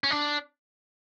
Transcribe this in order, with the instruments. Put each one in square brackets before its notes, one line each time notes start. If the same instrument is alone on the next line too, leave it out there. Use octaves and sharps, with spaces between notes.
[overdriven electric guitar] C#4
D4